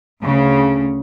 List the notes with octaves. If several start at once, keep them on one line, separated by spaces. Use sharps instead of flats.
D2 C#3